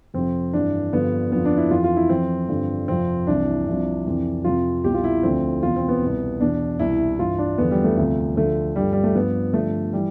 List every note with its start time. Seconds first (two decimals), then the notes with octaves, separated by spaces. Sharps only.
0.14 F2 C3 F3 C4
0.53 G2 E3 D4
0.92 G2 D3 F3 B3
1.32 F2 D3 F3 B3
1.45 D4
1.57 E4
1.71 F2 E3 F4
1.84 F4
1.96 E4
2.10 F2 E3 C4
2.49 G2 D3 F3
2.88 F2 C3 F3 C4
3.27 C2 C3 E3 D4
3.66 C2 C3 F3
4.06 F2 C3 E3
4.44 F2 C3 F3 F4
4.84 C2 B2 G4
4.94 F4
5.04 E4
5.23 D2 D3 F3 C4
5.62 E2 B2 F4
5.76 C4
5.89 B3
6.02 C2 B2
6.40 E2 B2 D4
6.79 C2 B2 E4
7.19 G2 E3 F4
7.38 D4
7.58 E2 D3 F3 B3
7.71 G3
7.84 A3
7.97 D2 C3 F3
8.36 D2 D3 F3 A3
8.76 G2 D3 F3 G3
8.93 G3
9.04 A3
9.15 G2 F3 B3
9.54 G2 D3 F3 A3
9.93 E3 G3